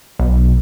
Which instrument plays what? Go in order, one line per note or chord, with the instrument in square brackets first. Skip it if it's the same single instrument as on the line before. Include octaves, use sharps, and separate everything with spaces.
[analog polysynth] B1